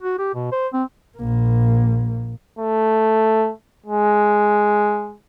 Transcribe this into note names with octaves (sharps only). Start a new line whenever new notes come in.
F#4
G4
B2
C5
C4
A#1 A#3
A3
G#3